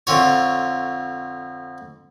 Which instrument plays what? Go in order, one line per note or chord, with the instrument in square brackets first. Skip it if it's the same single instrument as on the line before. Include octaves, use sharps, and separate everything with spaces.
[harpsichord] F2 D3 F4 C#5